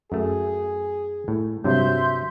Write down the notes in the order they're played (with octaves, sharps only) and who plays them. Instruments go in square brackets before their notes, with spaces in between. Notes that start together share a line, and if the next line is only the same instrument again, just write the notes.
[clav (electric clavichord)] F#2 A3 [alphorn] G#4
[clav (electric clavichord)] A2
[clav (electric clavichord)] G2 C3 F#3 [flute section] E5 C6 G6